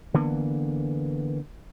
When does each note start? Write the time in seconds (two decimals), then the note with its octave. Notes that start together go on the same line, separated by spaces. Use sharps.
0.14 D3 E3 A#3 B3